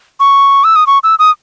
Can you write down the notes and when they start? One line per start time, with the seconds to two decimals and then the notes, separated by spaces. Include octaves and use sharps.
0.20 C#6
0.64 E6
0.76 D#6
0.87 C#6
1.04 E6
1.19 D#6